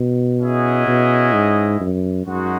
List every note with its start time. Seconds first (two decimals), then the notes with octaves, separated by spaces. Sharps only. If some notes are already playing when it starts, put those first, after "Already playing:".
Already playing: B2
0.40 C#4 E4 G#4 D#5 F#5
0.88 B2
1.34 G#2
1.80 F#2
2.26 F#2 G#3 D#4 F#4